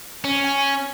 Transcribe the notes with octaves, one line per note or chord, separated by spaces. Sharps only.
C#4
G#5